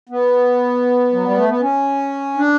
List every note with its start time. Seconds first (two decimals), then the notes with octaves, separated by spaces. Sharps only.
0.09 B3
1.12 F#3
1.24 G3
1.37 A3
1.49 B3
1.61 C#4
2.37 D4